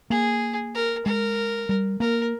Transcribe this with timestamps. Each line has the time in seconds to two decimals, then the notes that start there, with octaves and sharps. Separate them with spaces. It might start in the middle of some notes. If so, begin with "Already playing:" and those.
0.10 A#3 G#4
0.74 A#4
1.06 G#3 A#4
1.69 G3
2.00 A#3 A#4